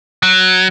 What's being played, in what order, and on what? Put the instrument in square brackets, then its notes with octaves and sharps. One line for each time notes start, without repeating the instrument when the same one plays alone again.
[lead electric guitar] F#3